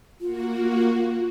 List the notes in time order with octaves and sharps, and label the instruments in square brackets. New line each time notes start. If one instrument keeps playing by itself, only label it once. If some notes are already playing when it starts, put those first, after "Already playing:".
[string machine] A#3 F#4 [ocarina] F4